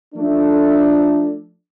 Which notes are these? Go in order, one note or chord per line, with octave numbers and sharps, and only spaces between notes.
F3 A3 D4